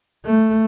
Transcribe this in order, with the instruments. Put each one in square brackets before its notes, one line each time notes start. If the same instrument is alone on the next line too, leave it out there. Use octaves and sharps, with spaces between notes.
[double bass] A3